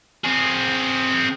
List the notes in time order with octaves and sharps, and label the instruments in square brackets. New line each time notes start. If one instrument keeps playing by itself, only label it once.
[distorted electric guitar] C4 G#4